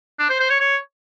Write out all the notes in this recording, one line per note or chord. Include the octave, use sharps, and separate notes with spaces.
D4
C5
C5
C#5
C#5